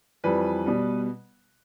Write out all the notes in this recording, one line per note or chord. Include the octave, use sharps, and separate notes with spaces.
F2 E3 G3 B4
B2 G3